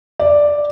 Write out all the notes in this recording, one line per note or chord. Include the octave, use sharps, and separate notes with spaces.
D5